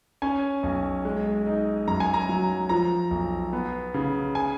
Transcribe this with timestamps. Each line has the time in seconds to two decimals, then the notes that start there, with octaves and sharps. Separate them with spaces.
0.22 C#4 G#5
0.63 B1
1.05 G#3
1.46 D#4
1.87 F#2 A#5
2.00 G#5
2.14 A#5
2.29 F#3
2.69 F3 A#5
3.11 B1
3.53 B3
3.94 C#3
4.35 G#5